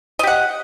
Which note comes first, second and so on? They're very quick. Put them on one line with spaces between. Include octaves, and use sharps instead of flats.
D#5 G4 F#5